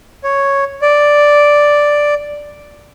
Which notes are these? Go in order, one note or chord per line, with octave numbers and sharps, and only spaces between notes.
C#5
D5